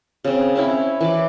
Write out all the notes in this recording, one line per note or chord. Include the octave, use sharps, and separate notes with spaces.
C#3 C4
C4 C#4 E4 C#5
E3 B4 D6